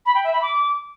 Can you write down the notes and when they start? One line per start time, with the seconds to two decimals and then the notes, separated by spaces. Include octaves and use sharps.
0.06 B5
0.15 G5
0.24 E5
0.33 B5
0.42 D6